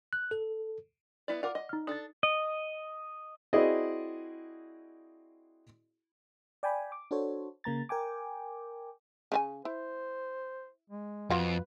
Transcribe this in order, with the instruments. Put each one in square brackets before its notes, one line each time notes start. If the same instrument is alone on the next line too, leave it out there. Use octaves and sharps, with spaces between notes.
[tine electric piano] F#6
A4
[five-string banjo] B3 E4 D5
[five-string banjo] F4 A#4 [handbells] D5 F#5 D6
[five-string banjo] D#5
[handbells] D#4 F6
[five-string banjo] D4 A4 [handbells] D#6 A6
[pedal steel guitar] D#5
[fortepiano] C4 E4 F#4 G#4 D5 D#5
[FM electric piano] D5 G5 G#5 B5
D6
D4 F#4 A4 C5 C#5
C#3 A#3 A#5 A6
A#4 G5 G#5 D6
[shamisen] C#3 E4 G#5
[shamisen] E4 [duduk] C5
[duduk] G#3
[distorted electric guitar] F2 [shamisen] F4 F#4 F5 [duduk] B4